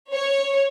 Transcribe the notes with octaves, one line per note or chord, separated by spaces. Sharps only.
C#5